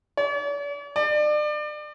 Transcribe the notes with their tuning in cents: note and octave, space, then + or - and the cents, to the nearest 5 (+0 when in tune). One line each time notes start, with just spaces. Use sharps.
D5 -45
D5 +35